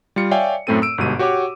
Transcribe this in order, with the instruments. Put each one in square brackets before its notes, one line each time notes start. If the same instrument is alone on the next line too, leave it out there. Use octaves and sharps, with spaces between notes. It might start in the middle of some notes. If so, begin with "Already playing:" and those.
[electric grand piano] G3 F4 C#7
C#5 D5 E5 F5 G5 G#5
F#2 A2 A3 C4 A4 D#7
E6 D7
G1 G#2 B2 G4 D#7
F#4 G4 C#5 F#5 D6